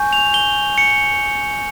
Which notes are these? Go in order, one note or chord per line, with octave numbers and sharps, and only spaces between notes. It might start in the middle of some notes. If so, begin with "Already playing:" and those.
Already playing: G#5 C#6 G6
F7
G7
C#7